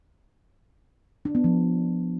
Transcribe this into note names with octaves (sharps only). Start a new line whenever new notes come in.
D4
B3
F3